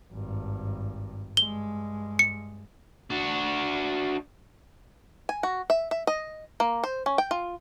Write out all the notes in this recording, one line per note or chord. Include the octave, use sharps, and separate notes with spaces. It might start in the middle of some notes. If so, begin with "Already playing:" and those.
G#1 G2
G2 G#3 G7
C#7
D4 F#4
G#5
F#4
E5
E5
D#5
A#3
C5
C#4
G5
F4